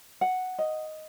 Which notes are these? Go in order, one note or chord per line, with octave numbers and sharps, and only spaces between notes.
F#5
D#5